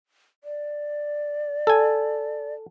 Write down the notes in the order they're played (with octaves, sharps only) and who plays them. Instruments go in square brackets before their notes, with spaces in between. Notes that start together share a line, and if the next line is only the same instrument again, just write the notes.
[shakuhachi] D5
[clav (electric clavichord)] A4 G#5